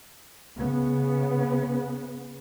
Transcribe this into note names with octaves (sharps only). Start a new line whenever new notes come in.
C#3 B3